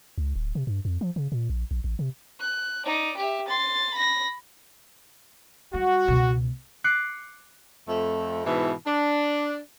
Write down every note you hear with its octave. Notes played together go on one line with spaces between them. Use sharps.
C#2
D1
C3
G2
F2
F3
C#3
A#2
A#1
A#1
A1
C3
F#6
D#4 D5
G4 E5
C6 A6
B5 A#6
G3 F#4
C#2 B2
D6 F#6 C7 C#7
F2 A3
G#2 B2 E3
D4